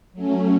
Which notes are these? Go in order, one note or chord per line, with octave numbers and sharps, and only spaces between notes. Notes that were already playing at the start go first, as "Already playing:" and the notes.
F#3 A3 C#4